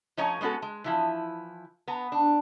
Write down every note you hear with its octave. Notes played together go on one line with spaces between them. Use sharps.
F3 A3 C#4 C#5 D#5 A#5
G#3 B3 C#4 F#4 A4
G#3
E3 F3 E4
B3 A#5
D4